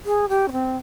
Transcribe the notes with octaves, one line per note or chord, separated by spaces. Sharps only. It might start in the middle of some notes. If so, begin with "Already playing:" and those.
G#4
G4
C#4
C4